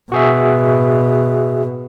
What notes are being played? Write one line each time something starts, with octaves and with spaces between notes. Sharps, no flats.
B2 F#4 G#4 E5